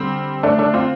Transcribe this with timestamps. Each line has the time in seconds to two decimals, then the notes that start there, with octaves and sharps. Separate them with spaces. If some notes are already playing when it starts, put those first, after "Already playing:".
Already playing: D3 G3 C4
0.43 A3 D4
0.59 A3 D4
0.74 C4 F4